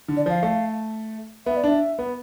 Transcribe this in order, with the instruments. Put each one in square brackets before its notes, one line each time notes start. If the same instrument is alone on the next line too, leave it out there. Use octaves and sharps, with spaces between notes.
[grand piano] D3
[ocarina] D5
[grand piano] F3 [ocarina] F5
[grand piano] A3
[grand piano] B3 [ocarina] E5
[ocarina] D5
[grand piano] D4 [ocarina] E5
[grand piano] B3